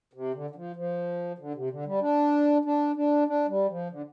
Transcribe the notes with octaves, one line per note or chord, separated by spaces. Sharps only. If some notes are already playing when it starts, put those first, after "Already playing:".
C3
D3
D3
F3
F3
D3
C3
D3
G3
D4
D4
D4
D4
G3
F3
D3